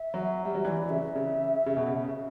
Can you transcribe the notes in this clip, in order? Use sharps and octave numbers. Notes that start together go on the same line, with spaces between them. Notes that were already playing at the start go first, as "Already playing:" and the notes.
Already playing: E5
F#3
G3
F#3
E3 D5
E3
C#3 E5
C#3
C#3
B2
C#3